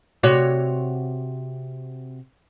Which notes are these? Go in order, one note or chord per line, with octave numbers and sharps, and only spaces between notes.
C3 F#4 C#5